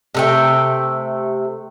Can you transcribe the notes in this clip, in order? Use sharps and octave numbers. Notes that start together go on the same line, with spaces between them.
C3 A3 G5